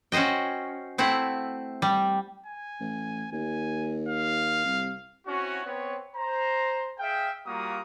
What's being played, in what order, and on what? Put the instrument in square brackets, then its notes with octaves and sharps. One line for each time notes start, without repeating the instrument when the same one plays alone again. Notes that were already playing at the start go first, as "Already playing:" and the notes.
[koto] C#4 F#4 C5 D#5 G5
A3 C4 E4 F#5
G3
[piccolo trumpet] G#5
[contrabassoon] A1
[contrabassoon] D#2 [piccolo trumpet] G#5
[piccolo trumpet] F5
[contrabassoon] C2
[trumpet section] C4 C#4 E4 F#4
B3 C4 B4 C#5
C5 A#5
G#4 E5 F5 G5
G3 A#3 F4 F#4 A#5 D#6